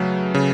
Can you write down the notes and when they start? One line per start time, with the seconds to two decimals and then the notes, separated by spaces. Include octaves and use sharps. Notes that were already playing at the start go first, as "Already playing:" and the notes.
Already playing: C#3 F#3 A3 B4
0.34 C#3